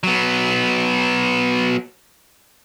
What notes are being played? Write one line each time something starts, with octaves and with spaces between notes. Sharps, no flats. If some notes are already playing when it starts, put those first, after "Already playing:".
F#3 B3